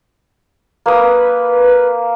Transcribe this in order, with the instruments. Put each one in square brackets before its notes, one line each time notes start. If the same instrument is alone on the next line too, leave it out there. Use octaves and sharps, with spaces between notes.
[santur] A#3 D#6 [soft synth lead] B4